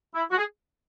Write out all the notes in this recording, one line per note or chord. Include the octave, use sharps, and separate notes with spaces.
E4
F#4
G#4